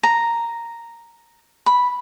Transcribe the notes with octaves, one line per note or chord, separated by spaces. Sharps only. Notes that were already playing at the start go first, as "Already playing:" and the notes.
A#5
B5